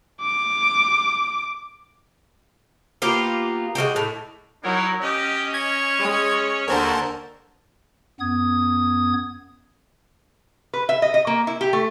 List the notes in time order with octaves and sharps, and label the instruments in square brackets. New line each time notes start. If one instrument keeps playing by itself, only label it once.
[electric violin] D6
[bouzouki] A#3 B3 F4 G4
G#3 A#3 F#4 G4
A2
[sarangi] F#3 [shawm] D#4 [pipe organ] E4 A#4 C#5
[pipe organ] C#4 [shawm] G4 [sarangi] D#5
[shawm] C#5 [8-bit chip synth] G#6
[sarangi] G#3
[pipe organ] D#2 F#4 [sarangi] D3 [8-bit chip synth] A#4 C5 A5 [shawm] G#5
[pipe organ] F#2 B3 D#6 G#6
[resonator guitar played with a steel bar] B4
E5
D#5
D#5
A#3
E4
G4
A3